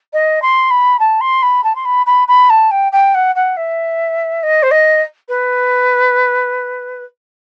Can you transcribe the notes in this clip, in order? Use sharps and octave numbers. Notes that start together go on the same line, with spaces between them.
D#5
C6
B5
A5
C6
B5
A5
C6
B5
B5
B5
A5
G5
G5
F#5
F#5
E5
D#5
C5
D#5
B4